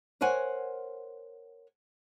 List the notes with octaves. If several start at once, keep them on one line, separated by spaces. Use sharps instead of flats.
A#4 C5 C#5 F#5 G#5